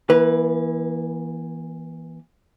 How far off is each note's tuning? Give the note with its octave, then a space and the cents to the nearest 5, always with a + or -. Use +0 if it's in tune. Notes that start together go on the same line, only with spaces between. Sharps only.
E3 +0 A#3 +40 B4 +0